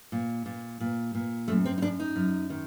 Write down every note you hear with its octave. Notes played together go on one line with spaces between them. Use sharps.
A#2
A#2
A#2
A#2
F#2 A3
C4
D#4
F#2 D4
D#4
F#2
D#3